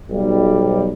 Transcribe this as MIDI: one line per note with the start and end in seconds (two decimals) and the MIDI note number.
0.10 0.91 35
0.10 0.91 55